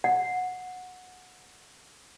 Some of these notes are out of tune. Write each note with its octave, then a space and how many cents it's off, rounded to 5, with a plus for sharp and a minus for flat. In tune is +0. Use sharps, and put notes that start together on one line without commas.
F#5 -15